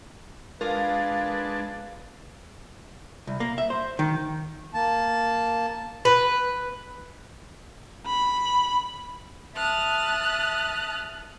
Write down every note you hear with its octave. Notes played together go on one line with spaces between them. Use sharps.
G#3 D4 F4 A#4 B4 A5
C2
A#3
E5
C5
D#3
A#3 A5
B4
B5
E5 A5 D#6 F6 F#6